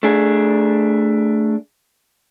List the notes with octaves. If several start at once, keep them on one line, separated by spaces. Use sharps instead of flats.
A3 D4 G#4